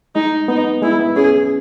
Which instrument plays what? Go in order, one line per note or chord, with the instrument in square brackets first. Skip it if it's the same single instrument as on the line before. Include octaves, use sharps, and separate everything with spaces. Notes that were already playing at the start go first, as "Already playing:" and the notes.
[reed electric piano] G#3 [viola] D#4
[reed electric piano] B3 [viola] D#4
[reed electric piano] G#3 [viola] E4
[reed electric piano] B3
[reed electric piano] C#4 [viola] G#4